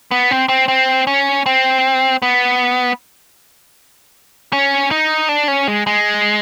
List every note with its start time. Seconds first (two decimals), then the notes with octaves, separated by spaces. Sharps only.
0.11 B3
0.31 C4
0.49 C4
0.68 C4
1.07 C#4
1.46 C4
2.22 B3
4.53 C#4
4.91 D#4
5.29 D4
5.48 C#4
5.68 G#3
5.87 G#3